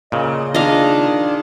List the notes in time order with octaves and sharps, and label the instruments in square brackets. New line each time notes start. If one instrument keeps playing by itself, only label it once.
[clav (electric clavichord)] A#2 C#3 [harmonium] D#5
[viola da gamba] D#3 G#4 [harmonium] D4 F4 [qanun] D#5 F5